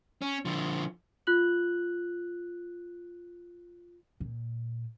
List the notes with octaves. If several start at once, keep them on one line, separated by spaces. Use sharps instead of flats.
C#4
D3 F3
F4 F#6 F#7
A#2